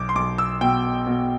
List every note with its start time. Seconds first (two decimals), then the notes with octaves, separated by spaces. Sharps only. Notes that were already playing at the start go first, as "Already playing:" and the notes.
Already playing: B1 D6
0.09 C6
0.15 B1 D6
0.38 E6
0.61 B2 G5
1.07 B2